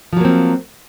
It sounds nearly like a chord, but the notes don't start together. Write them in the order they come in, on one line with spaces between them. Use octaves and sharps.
F3 F#3 A#3 C4